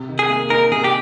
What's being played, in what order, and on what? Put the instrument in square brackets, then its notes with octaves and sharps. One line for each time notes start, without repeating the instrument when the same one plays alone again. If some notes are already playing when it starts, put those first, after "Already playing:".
Already playing: [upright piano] C3
D#3
[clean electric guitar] G#4
[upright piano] A#3
[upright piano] D#4 [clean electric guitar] A#4
[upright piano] C3 [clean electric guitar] G#4
[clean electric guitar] G4